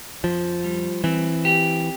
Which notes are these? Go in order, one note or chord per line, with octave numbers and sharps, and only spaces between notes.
F2 F3
G3
E3 C4
G4